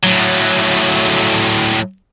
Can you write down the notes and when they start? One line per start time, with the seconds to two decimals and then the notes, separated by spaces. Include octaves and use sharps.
0.03 A2 F#3